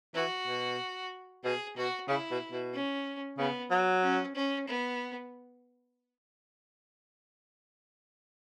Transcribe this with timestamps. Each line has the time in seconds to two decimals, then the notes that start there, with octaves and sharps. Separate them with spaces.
0.15 E3 F#4
0.47 B2
1.44 B2 G#4
1.77 B2 F#4
2.08 C#3 E4
2.31 B2
2.52 B2
2.73 C#4
3.38 C#3 B3
3.71 F#3
4.03 C#4
4.35 C#4
4.68 B3